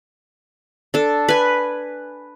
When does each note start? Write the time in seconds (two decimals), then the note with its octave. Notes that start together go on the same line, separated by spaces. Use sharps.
0.94 D4 A4
1.29 B4 G#5